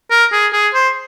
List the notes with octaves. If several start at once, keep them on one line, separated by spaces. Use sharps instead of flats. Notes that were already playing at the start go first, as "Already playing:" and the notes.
A#4
G#4
G#4
C5